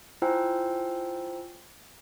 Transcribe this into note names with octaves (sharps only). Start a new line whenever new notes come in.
E4 F4 C5 G5 G#5 E6